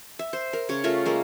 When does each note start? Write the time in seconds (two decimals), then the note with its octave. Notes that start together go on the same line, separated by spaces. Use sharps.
0.19 E5
0.33 C5
0.53 A#4
0.69 C#3 C#5
0.84 A3 F4 A#4 E5
1.06 G#3 A#3